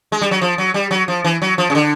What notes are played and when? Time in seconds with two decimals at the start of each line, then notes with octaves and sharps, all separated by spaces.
0.12 G#3
0.21 G3
0.31 F#3
0.41 F3
0.58 F#3
0.74 G3
0.91 F#3
1.08 F3
1.24 E3
1.42 F#3
1.58 F3
1.70 C#3
1.75 D3